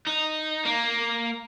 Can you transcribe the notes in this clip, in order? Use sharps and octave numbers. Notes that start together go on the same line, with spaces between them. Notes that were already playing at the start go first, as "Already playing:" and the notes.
D#4
A#3